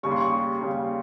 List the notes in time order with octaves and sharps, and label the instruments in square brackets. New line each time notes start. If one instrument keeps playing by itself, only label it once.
[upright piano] D#2 C#3 G3 C#6
C6
C#6
D#2 C#3 G3